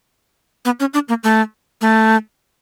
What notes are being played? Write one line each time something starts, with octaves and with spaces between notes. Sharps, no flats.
B3
C#4
D4
A#3
A3
A3